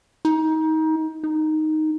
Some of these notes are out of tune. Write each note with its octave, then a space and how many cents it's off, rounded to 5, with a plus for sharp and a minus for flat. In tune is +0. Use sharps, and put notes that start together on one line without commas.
D#4 +25
D#4 +0